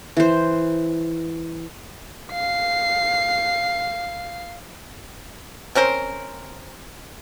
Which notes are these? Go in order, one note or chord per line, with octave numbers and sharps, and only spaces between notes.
E3 C5
F5 C7
C4 C#4 A#4 C5